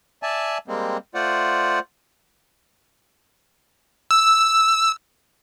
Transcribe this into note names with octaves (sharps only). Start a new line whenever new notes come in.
D5 E5 G#5 A5
G3 G#3 A#3 C4
A3 F4 C5 D5 F#5
E6